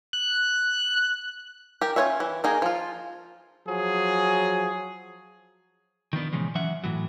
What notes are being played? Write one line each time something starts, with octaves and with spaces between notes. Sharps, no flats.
F#6
G4 A#4
C#4 F4 B4 C#5 E5
E3
A#3 D#4 G#4 A#4
F3 F4
F3 F#3 G#4
D#3 F3 B3 D4
A#2 C#3 E3 F3 G#3
E3 F#3 C#4 E5 F#5
A2 E3 F#3